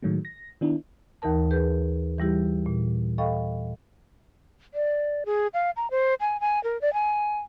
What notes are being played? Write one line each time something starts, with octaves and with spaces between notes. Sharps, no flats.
A2 D#3 F#3 G#3 A3
A#6
D#3 B3 D4 E4
D#2 E3 D#4 A#4 A5
G#4 B4 G6
E3 G3 E4 G4
A#2
A4 D#5 F5 G5 B5 C#6
D5
G#4
F5
A#5
C5
G#5
G#5
A#4
D5
G#5